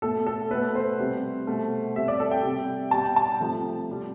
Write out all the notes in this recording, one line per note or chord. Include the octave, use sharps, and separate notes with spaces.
B2 A3 A4
A4
B2 A3 B4
C5
C3 G3
B2 A3
C3 G3 E5
D5
A4
G5
C3 G3
B2 G3 A5
G5
A5
C3 F3 A3
C3 G3